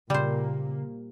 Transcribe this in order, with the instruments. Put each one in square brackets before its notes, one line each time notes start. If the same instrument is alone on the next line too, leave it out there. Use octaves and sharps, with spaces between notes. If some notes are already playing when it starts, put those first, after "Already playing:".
[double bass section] A#2 A#3 [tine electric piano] C#3 [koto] G3 C5